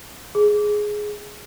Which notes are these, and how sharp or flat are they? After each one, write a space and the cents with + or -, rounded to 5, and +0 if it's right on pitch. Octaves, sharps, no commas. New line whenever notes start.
G#4 +5